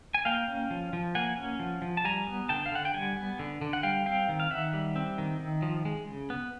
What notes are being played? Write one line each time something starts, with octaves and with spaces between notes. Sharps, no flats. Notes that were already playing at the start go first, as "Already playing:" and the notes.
G#5
A#3 F5 G5
C#4
F3
F3
A#3 F#5 G#5
C#4
F3
F3
A5
G3 G#5 A#5
B3
D3 G5 A5
F5
D3 F#5
G5
G3 F#5 G#5
B3
D3
D3
F#5
G3 F5 G5
C4 F5 G5
D#3
F5
D#3 E5 F#5
G3
C4
D#3
D#3
F3
G#3
C#3
B3